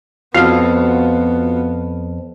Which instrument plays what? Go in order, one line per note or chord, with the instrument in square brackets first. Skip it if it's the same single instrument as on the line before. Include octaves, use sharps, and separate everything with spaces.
[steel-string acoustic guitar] F2 [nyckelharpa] B3 [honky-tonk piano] F4 F#4 [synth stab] F5